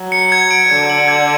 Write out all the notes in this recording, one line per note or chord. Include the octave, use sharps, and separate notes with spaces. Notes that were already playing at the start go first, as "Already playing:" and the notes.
Already playing: F#3
C#7
G#6
D7
D3 G#6
F#7
G#6